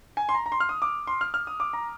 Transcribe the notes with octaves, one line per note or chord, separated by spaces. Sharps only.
G#5
C6
A#5
A#5
C6
F6
D#6
D6
C6
F6
F6
D#6
D6
A#5